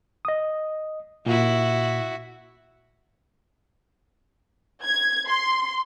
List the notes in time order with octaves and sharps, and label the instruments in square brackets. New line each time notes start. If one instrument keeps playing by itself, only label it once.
[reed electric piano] D#5 D#6
[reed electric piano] A#2 [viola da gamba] E4 F#4
[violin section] G#6
C6